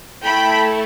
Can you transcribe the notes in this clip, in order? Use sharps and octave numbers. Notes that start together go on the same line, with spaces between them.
A3 E4 A4 G5 B5